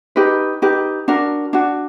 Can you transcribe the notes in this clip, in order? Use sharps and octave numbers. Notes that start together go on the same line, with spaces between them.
D#4 G4 B4
D#4 G4 B4
D4 F#4 A#4
D4 F#4